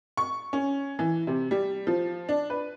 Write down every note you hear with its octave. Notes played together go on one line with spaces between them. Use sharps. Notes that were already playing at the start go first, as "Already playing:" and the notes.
C#6
C#4
E3
C3
G3
F3
D4
B4